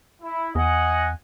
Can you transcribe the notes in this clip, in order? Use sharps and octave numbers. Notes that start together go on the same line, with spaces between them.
E4
E2 D#5 F#5 G#5